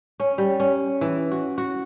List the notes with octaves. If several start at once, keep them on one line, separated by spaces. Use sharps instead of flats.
C#4
G3
C#4
E3
F#4
F#4